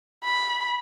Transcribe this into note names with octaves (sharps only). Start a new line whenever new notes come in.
B5